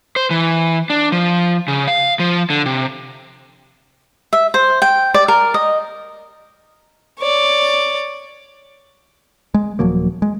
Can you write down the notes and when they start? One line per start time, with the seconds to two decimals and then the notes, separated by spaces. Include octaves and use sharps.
0.16 C5
0.31 E3
0.90 D4
1.12 F3
1.68 C#3
1.87 F5
2.19 F3
2.50 D3
2.66 C3
4.33 E5
4.54 C5
4.82 G5
5.14 D5
5.28 A#4
5.54 D#5
7.20 C#5 D5
9.54 G#3
9.79 D#1 F3 F#3 A#3
10.22 G#3